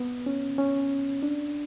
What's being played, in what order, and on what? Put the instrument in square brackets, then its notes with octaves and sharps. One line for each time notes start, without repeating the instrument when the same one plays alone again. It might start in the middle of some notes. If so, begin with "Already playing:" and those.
Already playing: [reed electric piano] B3
C#4
C#4
D4